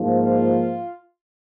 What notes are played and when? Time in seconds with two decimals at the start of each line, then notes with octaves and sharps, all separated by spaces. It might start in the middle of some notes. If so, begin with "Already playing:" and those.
Already playing: G#2 F3 A#3
0.14 F4